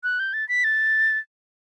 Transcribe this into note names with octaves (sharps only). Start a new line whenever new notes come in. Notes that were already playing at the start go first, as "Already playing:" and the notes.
F#6
G6
A6
B6
A6